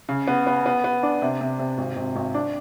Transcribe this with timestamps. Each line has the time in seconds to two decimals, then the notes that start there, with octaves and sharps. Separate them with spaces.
0.09 C#3
0.28 B3
0.47 B3
0.66 B3
0.84 B3
1.03 D4
1.22 C3
1.41 C3
1.59 C3
1.78 G#1
1.96 G#1
2.16 G#1
2.34 D4